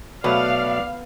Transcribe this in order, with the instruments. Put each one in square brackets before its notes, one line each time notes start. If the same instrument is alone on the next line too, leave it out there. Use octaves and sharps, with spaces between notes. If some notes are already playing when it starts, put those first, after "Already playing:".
[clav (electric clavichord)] B2 F#3 A3 [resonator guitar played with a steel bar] B3 [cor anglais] D5 [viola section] F5